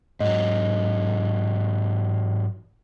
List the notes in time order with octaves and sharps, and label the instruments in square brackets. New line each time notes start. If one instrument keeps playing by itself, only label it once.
[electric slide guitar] G#2 F#3 [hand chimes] D#5